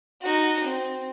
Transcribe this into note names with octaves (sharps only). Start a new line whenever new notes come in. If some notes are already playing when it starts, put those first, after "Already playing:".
D#4 F#4
C4